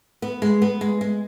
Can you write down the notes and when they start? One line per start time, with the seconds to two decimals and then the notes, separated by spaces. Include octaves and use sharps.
0.22 B3
0.42 G#3
0.62 B3
0.81 G#3
1.01 G#3